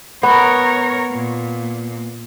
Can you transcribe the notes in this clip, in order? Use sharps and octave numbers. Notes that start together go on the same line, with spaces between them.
B3 A#4 C#5
A#2